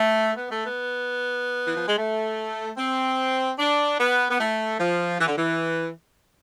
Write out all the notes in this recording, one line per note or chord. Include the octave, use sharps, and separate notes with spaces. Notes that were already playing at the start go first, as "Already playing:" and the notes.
Already playing: A3
B3
A3
B3
E3
F3
G#3
A3
C4
D4
B3
B3
A3
F3
E3
D3
E3